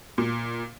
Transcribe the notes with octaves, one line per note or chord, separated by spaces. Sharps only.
A#2